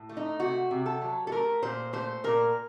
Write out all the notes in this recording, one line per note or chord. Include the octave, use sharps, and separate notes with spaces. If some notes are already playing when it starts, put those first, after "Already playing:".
Already playing: A2
A3
D#4
C3 F#4
C3
A4
F#3
A4
A3 A#4
A#2 C5
A3 C5
A#2 A#4